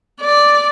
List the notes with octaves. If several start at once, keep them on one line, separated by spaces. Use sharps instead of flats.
D5